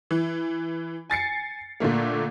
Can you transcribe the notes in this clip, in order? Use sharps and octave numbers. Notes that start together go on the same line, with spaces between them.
E3
G#5 A6 C7 C#7
A#2 D3 A3 A#3